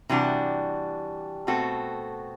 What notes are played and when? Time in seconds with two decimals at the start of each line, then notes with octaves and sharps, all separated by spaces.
0.09 C3 E3 G3 D4 F#4
1.47 B2 A3 C4 F#4 A4